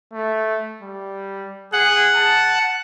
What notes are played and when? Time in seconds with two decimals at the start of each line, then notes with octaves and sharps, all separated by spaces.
0.13 A3
0.82 G3
1.73 G#4 F#5
2.15 A5